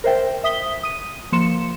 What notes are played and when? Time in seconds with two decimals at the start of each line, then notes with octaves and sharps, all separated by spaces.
0.04 A#4 C5 E5 G5
0.44 E5 D#6 B6 G7
0.83 D#6 D#7
1.32 F3 A#3 C6 C#7 E7